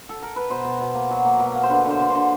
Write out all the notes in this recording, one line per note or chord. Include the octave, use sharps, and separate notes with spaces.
A4
A#4
B4
B2 C5
B2
B2
A#3
F#3
A#3
B2
A#3
C5
D3 B4
D3 C5
D3
C5
D3